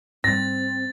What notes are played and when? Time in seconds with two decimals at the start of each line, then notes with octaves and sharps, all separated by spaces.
0.24 G#2 G3 C4 A6 A#6